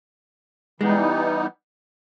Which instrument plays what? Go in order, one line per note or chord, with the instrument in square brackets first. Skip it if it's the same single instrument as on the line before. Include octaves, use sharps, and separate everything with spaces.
[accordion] E3 G3 B3 D#4 [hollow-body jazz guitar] G#3